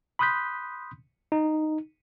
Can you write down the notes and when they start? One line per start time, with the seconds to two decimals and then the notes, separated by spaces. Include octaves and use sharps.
0.19 B5 C6 D#6 F#6 G6 B6
1.32 D#4